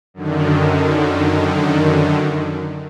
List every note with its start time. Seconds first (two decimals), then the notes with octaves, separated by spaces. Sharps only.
0.14 F#2 D3 D#3